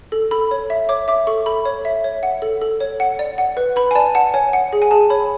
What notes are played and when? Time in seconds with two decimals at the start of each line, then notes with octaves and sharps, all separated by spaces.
0.12 A4
0.31 A4 B5
0.51 C#5
0.70 E5
0.89 C#5 D6
1.08 E5 D6
1.27 A4 C#6
1.46 A4 B5
1.65 C#5
1.85 E5
2.04 C#5
2.23 F#5
2.42 A4
2.62 A4
2.80 C#5
3.00 F#5
3.19 D5
3.38 F#5
3.57 B4
3.76 B4 B5
3.91 G#5
3.95 D5 A5
4.15 F#5 A5
4.34 C#5 G#5
4.53 F#5
4.73 G#4
4.82 G#5
4.91 G#4 A5
5.10 C#5 B5